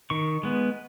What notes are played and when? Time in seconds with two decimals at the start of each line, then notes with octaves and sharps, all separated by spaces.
0.10 D#3 C#6
0.43 G#3 B3